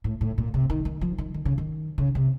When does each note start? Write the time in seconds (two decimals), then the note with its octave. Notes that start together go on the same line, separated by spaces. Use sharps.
0.04 A2
0.21 A2
0.38 A#2
0.54 C3
0.70 D#3
0.85 D#3
1.01 F3
1.18 D#3
1.34 D#3
1.45 C#3
1.58 D#3
1.98 C#3
2.15 C3